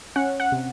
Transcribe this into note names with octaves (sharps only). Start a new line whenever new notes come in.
C#4 F#5
F#5
C3